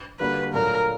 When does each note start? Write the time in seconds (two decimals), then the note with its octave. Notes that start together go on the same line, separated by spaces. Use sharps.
0.20 D3 G3 A#3 D4 F#4 B4
0.54 A#2 F#3 A3 D4 A#4